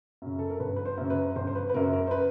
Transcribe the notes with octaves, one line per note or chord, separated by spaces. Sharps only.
F#2 C#3
A4
A#4
G1 B4
B4
C5
F#2 C#3
B4
G1 C5
C5
B4
B4
F#2 C#3 A#4
A#4
C5
B4